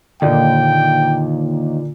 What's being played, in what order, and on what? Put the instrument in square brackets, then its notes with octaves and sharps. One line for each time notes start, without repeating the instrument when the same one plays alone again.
[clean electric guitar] D#2 [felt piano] A#2 A#3 D5 [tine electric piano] D3 [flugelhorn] G5